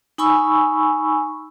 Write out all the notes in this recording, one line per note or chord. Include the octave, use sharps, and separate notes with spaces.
D#4 G#5 B5 C#6 E6